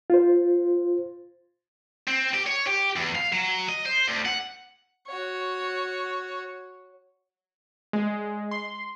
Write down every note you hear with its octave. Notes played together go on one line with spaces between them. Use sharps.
F4 C5
C4
G4
C#5
G4
E2
F5
F#3
D#5
C5
D2
F#5
F#4 C#5
G#3
C6